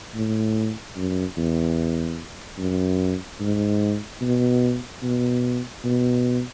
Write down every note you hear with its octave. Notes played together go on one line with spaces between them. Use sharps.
A2
F#2
E2
F#2
G#2
B2
B2
B2